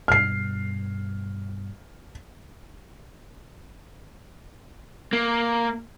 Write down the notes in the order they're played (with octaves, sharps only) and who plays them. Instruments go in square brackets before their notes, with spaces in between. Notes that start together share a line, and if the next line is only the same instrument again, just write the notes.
[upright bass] G2 B2 [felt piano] F6 C7
[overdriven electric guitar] A#3